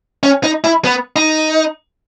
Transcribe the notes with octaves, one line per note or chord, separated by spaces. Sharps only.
C#4
D#4
E4
B3
D#4